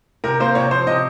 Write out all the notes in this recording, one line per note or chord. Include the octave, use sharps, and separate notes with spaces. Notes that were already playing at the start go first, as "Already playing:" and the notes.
C3 A#4
A#3 C5
C3 C#5
F3 C5
C3 D#5